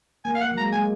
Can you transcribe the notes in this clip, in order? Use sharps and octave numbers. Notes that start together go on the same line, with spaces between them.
A#3 G#5
F5
A#3 F#5
F#3
G#3 A#5
G#3 G#5